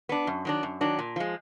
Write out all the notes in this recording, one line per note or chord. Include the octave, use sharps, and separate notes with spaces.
B3 D4
F#2
D#3 F#3 D4
F#2
D#3 F#3 D4
A#2
F3 G#3